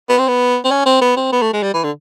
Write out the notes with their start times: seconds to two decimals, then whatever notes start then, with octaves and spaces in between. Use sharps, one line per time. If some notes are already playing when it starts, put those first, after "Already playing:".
0.09 B3
0.18 C4
0.28 B3
0.64 C4
0.71 C#4
0.86 C4
1.01 B3
1.17 C4
1.33 B3
1.42 A3
1.53 G#3
1.63 G3
1.74 E3
1.84 D3